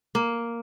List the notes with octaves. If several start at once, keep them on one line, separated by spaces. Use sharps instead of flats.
A#3